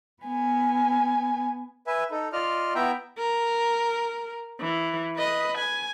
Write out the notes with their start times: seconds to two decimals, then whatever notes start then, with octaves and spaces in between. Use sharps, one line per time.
0.23 B3 G#5
1.87 B4 E5 G#5
2.11 D#4 A4
2.33 F4 D5 D#5 F6
2.75 B3 E4 E5 G5 A#5
3.19 A#4
4.60 E3
5.17 B4 D#5
5.58 G#5